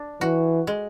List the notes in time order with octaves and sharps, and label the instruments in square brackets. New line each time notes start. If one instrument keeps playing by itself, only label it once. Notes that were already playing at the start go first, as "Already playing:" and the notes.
Already playing: [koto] D4
[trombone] E3 [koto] F#4
[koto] G#3